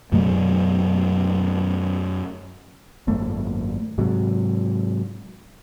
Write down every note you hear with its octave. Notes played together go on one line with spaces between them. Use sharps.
F#2 B2 F#3 A3
G#1 F#2 A3 A#3
G#2 C3 F#3